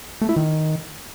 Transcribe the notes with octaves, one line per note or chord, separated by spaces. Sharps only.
A3
E4
D#3